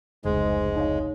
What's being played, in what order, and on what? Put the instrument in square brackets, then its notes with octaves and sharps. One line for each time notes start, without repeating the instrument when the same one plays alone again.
[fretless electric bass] F1 C#2 [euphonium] G#2 [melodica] G#3
[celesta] D#4 C#5 F5